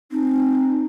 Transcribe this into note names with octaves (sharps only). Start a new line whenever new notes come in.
C4 D#4